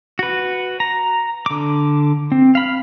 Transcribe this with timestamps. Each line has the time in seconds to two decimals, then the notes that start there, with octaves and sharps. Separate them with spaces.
0.19 F#4 B4
0.80 A#5
1.46 D3 D6
2.32 C4
2.55 F5 B5 F6